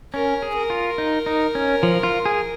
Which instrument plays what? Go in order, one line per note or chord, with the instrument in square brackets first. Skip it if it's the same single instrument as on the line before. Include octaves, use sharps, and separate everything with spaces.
[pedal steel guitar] C#4 [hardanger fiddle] A#4
[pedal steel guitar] G#4
[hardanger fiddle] A#4
[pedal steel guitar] F4
D#4
D#4
C#4
F3
F4
G#4